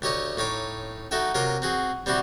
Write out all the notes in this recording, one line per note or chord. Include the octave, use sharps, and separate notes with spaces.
D2 G4 C#5 D#5 C#6
A2 D#4 C#5 D6
D#4 F#4 A4 E5 G5
C3 F#3 F4 A#4 D6 D#6
C4 F#4 G#4
G3 C4 E4 F#4 G4